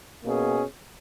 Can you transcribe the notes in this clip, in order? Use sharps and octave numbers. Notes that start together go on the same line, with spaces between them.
B2 A#3 C#4 G#4